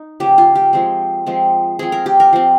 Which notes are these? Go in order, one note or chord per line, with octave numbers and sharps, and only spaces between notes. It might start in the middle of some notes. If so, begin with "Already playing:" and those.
Already playing: D#4
C#3 F3 A#3 C#4 G4
F4
G4
F3 G#3 C4
F3 G#3 C4
F3 C4 G#4
A#4
G4
A#4
F3 C4